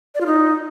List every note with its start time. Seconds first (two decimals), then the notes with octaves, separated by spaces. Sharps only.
0.15 D5
0.20 F4
0.26 D#4